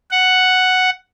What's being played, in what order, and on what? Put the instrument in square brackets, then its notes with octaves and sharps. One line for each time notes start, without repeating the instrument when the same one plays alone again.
[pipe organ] F#5